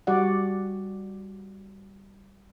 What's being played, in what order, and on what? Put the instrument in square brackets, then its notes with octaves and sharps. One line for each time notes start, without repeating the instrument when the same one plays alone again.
[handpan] G3 F#4 D5 F#5